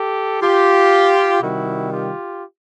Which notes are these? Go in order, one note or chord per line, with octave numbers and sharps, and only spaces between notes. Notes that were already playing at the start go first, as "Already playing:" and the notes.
Already playing: G4 A4
F4 G4
C3 D#3 G3 E4 F#4
F4 G4